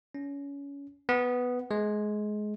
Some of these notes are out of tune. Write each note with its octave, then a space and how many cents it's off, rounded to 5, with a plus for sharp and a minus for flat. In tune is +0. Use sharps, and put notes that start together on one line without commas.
C#4 +25
B3 +5
G#3 +20